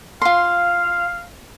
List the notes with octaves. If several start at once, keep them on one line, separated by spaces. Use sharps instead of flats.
F4 F5 C6